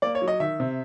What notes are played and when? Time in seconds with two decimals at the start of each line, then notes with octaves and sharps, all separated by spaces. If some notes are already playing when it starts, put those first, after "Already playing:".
0.02 A#3 D5
0.15 C#5
0.22 F#3
0.28 D#5
0.40 D#3 E5
0.60 C3